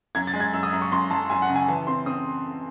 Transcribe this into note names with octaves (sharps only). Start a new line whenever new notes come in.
F#2 G#6
A6
G#3
G#6
F#2 E6
D#6
F#2
C#6
F#2 C6
F#2 A5
F#2 G#5
F#5
C#3
G#5
E3 A5
C4 C6
C4 D#6